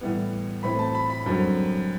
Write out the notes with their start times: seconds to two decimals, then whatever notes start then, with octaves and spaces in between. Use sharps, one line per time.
0.01 A2 E3 G3 B3
0.63 A2 E3 A3 C4 B5
0.79 A5
0.95 B5
1.10 B5
1.26 F#2 D3 G3 C4